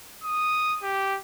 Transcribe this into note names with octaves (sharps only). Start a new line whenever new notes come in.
D#6
G4